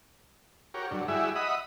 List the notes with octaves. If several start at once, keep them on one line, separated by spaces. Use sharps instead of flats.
F#4 G4 A#4 C#5
G2 D3 F#3
G3 E4 F#4 G#4 E5
D#5 E5 F#5 B5 D#6